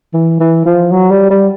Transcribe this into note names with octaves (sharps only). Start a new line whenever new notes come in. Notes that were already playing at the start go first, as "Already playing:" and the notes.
E3
E3
F3
F#3
G3
G3